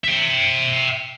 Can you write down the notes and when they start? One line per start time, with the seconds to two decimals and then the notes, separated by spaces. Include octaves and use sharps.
0.04 E5 G5